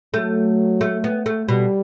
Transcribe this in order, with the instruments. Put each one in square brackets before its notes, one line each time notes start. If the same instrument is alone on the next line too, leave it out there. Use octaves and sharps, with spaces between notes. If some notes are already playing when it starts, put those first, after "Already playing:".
[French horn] F#3 [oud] A3
[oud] A3
B3
A3
[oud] B2 [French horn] G3